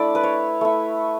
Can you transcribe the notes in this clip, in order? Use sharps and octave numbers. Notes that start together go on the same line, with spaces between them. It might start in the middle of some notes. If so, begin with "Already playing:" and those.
Already playing: A3 D4 E4 D5
B4
C#5
A3 E4